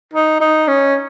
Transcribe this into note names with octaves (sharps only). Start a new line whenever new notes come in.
D#4
D#4
C#4